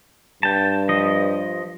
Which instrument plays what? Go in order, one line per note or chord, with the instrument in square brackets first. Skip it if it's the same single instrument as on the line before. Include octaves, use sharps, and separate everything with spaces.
[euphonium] G2 [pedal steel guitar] G5 A5
[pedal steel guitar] F3 D#5